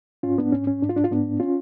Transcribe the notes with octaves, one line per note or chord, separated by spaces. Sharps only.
G#2 C#4 F4
B3 D4
G#2 C#4
C#4
G#2 D4
F4
D4
F4
G#2 B3 D4
C#4 F4